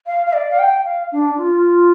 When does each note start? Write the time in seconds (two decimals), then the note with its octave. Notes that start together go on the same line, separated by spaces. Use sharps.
0.07 F5
0.27 F5
0.33 D5
0.51 F5
0.59 G5
0.85 F5
1.12 D4
1.37 F4